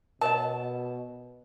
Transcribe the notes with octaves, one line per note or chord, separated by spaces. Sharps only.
B2 A#4 C#5 D#5 A5